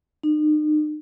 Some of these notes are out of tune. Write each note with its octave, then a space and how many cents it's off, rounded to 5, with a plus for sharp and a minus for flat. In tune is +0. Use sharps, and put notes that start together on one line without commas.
D#4 -40